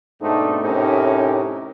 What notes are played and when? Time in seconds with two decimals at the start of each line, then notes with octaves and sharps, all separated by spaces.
0.22 G#2 B2 A3 C4 D4 D#4
0.62 A2 C3 C#4 D#4 G4 A#4